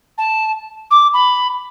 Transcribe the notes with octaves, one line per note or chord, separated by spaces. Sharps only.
A5
D6
B5